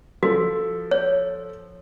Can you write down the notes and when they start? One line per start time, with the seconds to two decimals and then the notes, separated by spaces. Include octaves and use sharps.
0.23 F3 F#4 A4
0.91 C#5